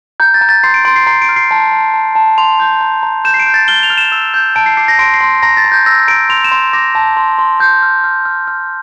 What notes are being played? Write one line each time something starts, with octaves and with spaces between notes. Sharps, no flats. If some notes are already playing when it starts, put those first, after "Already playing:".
A#5 G6
A6
A#5
A6
C6 C7
D7
C6 D7
C7
A#5 C7
D7
F6
C7
A5
A5
A5
A5
C6 F7
G6
A#5
A#5
G6 E7
C7
D7
G6
A6
F6 G7
F7
F6
E7
E6
G6
A5 D7
C7
D6 C7
A#6
C6 D7
C7
C6
A#5 A#6
A6
A#5
G6
E6 A#6
A#5 D7
C6 F7
E7
C6
D6 A#6
A5
C6
C6
C6 G6
F6
F6
F6
F6